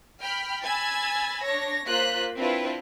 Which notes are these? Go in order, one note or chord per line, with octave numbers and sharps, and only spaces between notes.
G5 B5 F6
G#5 B5 E6 G#6 A6
D4 C#5 A#6
A#3 F4 C5 F#6 B6
C4 D4 E4 F4 B4